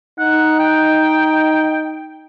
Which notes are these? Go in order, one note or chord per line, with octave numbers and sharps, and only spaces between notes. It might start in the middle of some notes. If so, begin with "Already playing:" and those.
D#4 F#5
G5